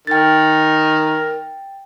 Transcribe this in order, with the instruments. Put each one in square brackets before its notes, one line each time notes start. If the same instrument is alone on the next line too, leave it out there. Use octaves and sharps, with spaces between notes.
[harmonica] D#3 A#4 [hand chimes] G5 A6